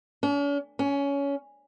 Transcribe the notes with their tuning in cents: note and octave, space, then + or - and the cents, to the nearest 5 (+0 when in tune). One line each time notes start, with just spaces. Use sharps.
C#4 +45
C#4 +20